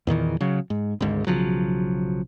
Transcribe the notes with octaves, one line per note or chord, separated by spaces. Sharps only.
E2 A#2 D#3 E3
C#3 F#3
G#2
G#1 D2 G#2
B1 C#3 F3 F#3